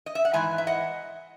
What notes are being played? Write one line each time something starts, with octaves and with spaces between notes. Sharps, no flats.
D#5
E5
F#5
G#2 E3 G#3 E5 G#5
E5
D#5 F#5